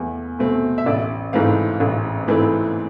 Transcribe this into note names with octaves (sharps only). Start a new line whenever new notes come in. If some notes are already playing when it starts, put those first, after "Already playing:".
Already playing: E2 A3
B2 A3 C4
E5
A1 D5
G#2 E3 A3 C4 F5
A1
G#2 E3 A3 C4